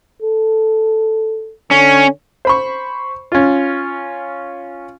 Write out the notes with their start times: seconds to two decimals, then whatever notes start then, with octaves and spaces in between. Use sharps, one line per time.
0.22 A4
1.71 D3 C#4
2.45 C5 B5 C#6
3.32 C#4 F4